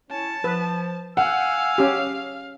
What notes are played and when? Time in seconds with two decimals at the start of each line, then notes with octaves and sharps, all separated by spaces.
0.10 C#4 E4 C#5 A5
0.44 F3 B4
1.17 F5 F#5 G#5 E6
1.78 C#4 G4